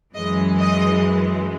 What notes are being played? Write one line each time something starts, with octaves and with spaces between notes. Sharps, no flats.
F#2 E3 G#3 D#5
D#5